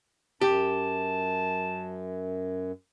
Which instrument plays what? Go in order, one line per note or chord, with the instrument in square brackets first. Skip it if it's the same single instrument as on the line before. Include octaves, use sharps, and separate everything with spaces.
[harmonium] F#2 [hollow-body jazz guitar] G4 [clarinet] A5